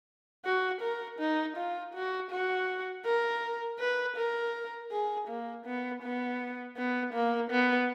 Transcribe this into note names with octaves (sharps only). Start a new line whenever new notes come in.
F#4
A#4
D#4
F4
F#4
F#4
A#4
B4
A#4
G#4
A#3
B3
B3
B3
A#3
B3